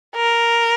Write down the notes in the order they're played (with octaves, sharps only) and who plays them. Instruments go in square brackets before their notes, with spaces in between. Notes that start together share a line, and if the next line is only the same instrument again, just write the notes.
[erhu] A#4